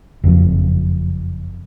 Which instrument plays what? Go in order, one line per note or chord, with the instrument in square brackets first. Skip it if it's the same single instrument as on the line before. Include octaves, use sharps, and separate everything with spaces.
[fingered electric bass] F#1 F2